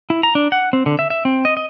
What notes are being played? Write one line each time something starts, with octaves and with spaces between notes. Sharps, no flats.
E4
A#5
D4
F#5
C4
D3
E5
E5
C4
D#5
D#5